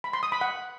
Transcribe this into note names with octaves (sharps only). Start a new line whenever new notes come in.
B5
C6
D#6
B5
F#5